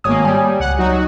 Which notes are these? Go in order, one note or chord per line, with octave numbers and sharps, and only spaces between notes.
G#1 A#3 C#5 G#5 D#6
G3 G#5
C#2 F#5
F#3 D#4 F#4